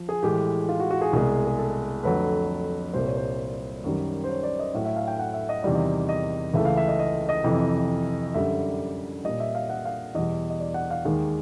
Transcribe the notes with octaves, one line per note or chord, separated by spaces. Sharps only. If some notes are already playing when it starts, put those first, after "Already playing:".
Already playing: F3
G#4
A2 E3 G#3 G4
F4
F#4
F#4
G#4
C2 B2 G#3
G#4
A4
F2 D3 F#3 A3 B4
C2 A#2 G3 C5
C#5
C5
F#2 D#3 G3
C5
C#5
D5
D#5
A2 F#3 A3 E5
E5
F5
G5
F#5
E5
D#5
E2 C3 D#3 G3 D5
D#5
D#5
C#2 C#3 E3 A3 E5
F5
E5
D#5
D#5
D#5
F2 C3 E3
F#2 D3 G3 E5
A#2 G3 D#5
E5
F5
F#5
F5
E2 B2 G3 D#5
D#5
D5
F#5
F5
D#2 D#3 G#3